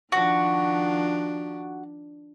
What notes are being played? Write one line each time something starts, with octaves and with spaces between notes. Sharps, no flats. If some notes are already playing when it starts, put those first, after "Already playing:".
D#3 F3 D4 F#4